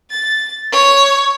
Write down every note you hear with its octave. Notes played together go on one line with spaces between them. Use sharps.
A6
C#5